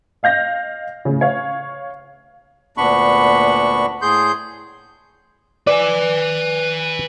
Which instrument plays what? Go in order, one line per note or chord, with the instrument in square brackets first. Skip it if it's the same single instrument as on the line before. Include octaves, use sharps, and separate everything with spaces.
[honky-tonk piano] D#5 F5 G6 A#6
A2 C#3
C#5 F5
[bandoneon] D2 A#2 B3 D4 B5 C#6
A2 G#4 C6 G6
[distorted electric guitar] B4 G#5 [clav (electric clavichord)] D5